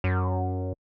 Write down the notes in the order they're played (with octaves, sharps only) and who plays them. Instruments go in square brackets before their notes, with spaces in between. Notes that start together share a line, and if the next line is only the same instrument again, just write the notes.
[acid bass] F#2